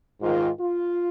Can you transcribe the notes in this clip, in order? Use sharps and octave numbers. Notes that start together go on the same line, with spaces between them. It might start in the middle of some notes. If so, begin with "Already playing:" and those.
G#2 D#3 F4
F4